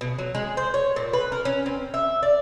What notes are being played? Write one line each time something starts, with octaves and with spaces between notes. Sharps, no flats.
B2
F#3
G#3
C5
C#5
A#2
B4
A#4
C#4
C4
E5
D5